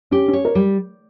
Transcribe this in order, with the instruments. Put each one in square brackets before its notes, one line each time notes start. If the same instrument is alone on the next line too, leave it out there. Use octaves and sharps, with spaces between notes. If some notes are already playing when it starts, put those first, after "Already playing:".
[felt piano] C#4 [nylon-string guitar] G4
[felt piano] C#4
[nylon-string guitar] C#5
[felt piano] A#4
[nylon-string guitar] G3